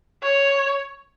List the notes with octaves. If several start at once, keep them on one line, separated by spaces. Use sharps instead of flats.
C#5